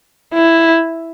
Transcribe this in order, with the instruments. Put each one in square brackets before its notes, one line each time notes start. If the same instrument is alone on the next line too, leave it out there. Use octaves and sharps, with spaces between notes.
[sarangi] E4